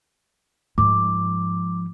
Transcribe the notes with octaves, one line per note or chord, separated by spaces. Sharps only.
G#2 F3 D6